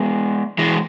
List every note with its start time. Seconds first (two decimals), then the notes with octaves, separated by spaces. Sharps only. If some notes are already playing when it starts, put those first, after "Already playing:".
Already playing: G#3 B3
0.58 E3 G#3